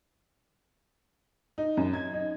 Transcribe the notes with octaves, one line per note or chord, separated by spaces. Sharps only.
D#4
F#2
G#6
D#4